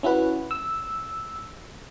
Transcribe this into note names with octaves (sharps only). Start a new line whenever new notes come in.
C#4 E4 F#4 B4
E6